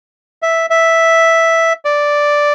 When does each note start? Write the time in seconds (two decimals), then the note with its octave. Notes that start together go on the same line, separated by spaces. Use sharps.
0.42 E5
0.70 E5
1.85 D5